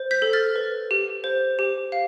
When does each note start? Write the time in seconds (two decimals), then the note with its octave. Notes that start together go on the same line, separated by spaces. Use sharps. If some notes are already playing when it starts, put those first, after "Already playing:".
Already playing: C5
0.11 G6 B6
0.22 A4
0.33 F6 A6
0.56 B4
0.91 G4
1.24 C5
1.59 G4
1.92 F5